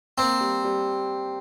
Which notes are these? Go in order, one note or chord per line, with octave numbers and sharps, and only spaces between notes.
A#3 C4
G3
G3